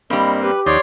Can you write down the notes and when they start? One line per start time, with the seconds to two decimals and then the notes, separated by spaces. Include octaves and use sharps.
0.10 G2 G3 A#3 C4 D#5
0.42 G4 B4
0.66 D#2 F3 D#4 C#5 D5 G5 C6